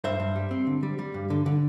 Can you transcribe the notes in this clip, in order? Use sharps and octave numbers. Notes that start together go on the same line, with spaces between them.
G2 C5 E5
G2
G3
C4
D3
G3
G3
G2
D3
D3